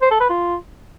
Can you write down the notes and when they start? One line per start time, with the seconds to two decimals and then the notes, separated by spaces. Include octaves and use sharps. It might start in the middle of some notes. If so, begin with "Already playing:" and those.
0.02 C5
0.11 A4
0.20 B4
0.30 F4